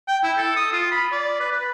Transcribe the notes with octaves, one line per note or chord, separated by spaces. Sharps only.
G5
E4
A4
D#6
F4
B5
D5
B4
B4